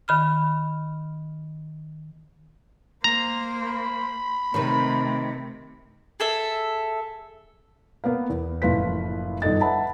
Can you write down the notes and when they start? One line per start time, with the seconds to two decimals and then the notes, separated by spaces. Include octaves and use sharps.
0.08 D#3 B5 F6
3.04 A#3 C5 A#5
3.62 B5
4.54 C3 D#3 A3 C4 B4
6.20 G#4 A4 E5
8.04 A#3 B3 B4 F5
8.29 E2
8.62 F#1 A2 F3 F4 B4 B6
9.42 G1 D#3 A4 D#5 A6
9.61 B4 E5 F#5 A5 B5